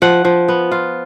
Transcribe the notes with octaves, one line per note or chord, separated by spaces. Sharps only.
F3 F#5
F3
B3
F4